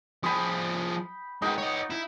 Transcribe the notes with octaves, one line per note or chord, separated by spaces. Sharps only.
F3 G#4 G5 B5 D#6
G#3 D#4 B4 F#5 G5
C#5 D#5
E4